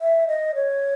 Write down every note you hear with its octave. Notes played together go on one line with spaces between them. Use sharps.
E5
D#5
C#5